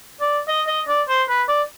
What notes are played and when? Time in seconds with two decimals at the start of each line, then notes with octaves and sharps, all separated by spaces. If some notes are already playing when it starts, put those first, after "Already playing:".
0.20 D5
0.48 D#5
0.67 D#5
0.88 D5
1.09 C5
1.29 B4
1.48 D5